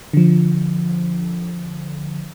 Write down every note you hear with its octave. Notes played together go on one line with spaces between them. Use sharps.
D3 F3